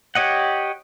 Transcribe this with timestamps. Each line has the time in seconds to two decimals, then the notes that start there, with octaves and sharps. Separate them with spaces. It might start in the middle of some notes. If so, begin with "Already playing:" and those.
0.15 G4 C#5 D#5 F#5